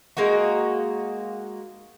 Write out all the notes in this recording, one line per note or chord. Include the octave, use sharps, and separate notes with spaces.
G#3 A#3 D#4 F#4